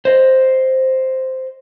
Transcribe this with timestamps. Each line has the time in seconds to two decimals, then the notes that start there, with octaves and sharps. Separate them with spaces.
0.05 C5 D#5